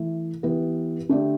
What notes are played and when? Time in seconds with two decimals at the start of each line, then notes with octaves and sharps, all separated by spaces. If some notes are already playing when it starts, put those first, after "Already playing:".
Already playing: E3 A3 E4
0.43 E3 B3 E4 G4 B4
1.09 D3 A3 D4 G4 D5